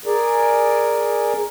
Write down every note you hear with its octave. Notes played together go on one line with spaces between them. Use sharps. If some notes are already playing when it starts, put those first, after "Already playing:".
G#4 A#4 D5